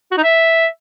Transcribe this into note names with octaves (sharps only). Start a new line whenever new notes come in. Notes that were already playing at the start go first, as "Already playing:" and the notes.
F#4
D#4
E5